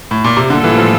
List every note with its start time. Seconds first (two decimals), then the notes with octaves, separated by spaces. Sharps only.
0.11 A2
0.24 A#2
0.37 C3
0.49 A2 D3 G3 A#3 F4 A4
0.64 E3
0.78 F3